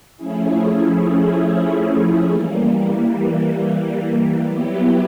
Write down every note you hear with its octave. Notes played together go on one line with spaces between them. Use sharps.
F3 A3 C#4 E4 G#4
E3 G3 A#3
F#3 B3 E4 G4